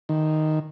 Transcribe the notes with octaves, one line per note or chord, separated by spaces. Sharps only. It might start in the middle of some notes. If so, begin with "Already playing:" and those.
D#3